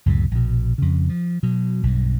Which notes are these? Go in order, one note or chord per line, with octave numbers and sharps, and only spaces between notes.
C#2 F#2 A2 C3
A#1 B2
F2 C#3
F3
B2 F#3
B1 G2